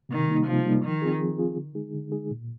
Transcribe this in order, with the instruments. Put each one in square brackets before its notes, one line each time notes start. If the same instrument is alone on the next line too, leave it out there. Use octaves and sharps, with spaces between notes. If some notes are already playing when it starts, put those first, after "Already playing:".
[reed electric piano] C3 [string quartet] D#3
[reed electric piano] G3 A#3 D#4
[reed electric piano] C3 [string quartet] F3
[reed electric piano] G3 A#3 D#4
[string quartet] D#3 [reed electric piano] F3
[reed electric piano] C4 F4 G#4
F3
C4 F4 G#4
D3
G#3 D#4 G#4
D3
G#3 D#4 G#4
A#2